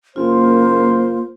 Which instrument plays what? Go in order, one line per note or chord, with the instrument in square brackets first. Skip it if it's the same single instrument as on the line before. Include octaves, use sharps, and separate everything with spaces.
[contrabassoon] F#1 [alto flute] A#3 [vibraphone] F4 [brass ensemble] C5